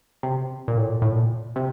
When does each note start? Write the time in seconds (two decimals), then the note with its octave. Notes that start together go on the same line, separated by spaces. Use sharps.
0.23 C3
0.68 A#2
0.77 A2
0.89 A#2
1.02 A2
1.12 A#2
1.56 C3